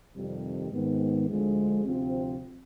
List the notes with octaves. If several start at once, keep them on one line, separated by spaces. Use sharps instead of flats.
F2 C3 D#3 G3
G#2 D#3 B3
D2 D3 F3 G#3
D2 C3 F3 C4